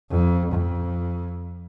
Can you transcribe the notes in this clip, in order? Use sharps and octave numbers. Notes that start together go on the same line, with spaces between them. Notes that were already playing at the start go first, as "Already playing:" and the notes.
F2
F2